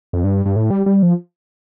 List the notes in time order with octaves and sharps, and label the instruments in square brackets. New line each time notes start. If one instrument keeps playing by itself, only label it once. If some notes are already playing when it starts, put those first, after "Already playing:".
[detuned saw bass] F2
G2
G2
A2
G3
G3
F3